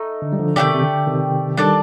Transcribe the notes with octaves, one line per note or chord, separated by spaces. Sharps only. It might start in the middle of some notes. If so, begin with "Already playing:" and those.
Already playing: A3 D#4
D3
G3
D3 F3
C3 D#3 A3 D#4 G4 D5
C3
D3
C3 D#3
D#3 G3 D4 A4 D5 A5